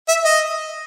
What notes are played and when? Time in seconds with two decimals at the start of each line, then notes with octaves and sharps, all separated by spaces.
0.09 E5
0.25 D#5